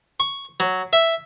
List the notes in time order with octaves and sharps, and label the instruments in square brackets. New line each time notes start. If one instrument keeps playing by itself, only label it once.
[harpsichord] C#6
F#3
E5